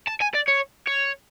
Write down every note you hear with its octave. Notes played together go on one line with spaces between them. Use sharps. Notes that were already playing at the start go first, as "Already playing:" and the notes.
A5
G#5
D5
C#5
C#5